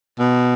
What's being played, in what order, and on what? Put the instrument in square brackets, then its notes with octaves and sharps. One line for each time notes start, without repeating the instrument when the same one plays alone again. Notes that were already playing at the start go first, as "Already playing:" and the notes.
[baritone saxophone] B2